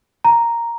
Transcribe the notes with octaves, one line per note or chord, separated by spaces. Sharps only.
A#5